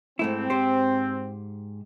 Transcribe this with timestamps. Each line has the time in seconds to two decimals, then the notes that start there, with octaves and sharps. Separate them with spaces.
0.19 G#2 A3 C4 E4
0.50 G#2 G4 C5